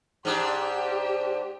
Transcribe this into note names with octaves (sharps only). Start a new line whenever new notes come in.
G#2 D4 G4